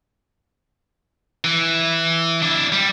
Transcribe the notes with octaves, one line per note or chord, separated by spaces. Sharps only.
E3
D4 E4
G3